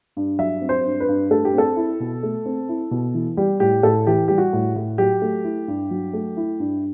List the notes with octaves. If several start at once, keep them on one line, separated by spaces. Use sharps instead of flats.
G2
F#3 E5
C4
C5
G2
B4
G2
A3 A4
G4
C4 A4
E4
B2
A3
C4
E4
B2
E3
G3 G4
A2 G4
A2 A4
E3 G4
G3 G4
F#4
A2
A2
F#3 G4
A3
E4
G2
F#3
A3
E4
G2